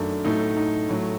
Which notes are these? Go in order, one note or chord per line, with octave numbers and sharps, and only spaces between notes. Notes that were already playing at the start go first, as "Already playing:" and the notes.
Already playing: F#2 D#3 A3 D4
A2 F#3 A3 D#4
D#4
A2 F#3 A3